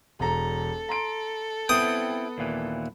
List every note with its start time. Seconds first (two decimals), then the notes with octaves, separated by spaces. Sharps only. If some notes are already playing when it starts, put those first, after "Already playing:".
0.20 E1 A4 A#5
0.89 A#5 C6 D7
1.69 B3 C4 E4 G5 D#6
2.38 D#2 A#2 E3